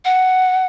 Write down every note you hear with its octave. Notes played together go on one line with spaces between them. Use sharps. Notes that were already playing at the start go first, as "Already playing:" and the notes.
F#5